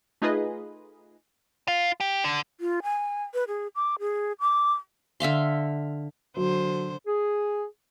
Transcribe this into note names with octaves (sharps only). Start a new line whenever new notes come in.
A3 D#4 F4 G#4 B4 D#5
F4
G4
D3
F4
G#5
B4
G#4
D6
G#4
D6
D3 E5 F5 C6
D3 F#3 C5
G#4